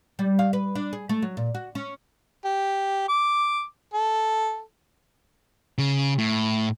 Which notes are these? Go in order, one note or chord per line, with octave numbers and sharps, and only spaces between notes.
G3
F5
B4
D4
G#4
A3
F#3
A#2
F#4
C#4
G4
D6
A4
C#3
A2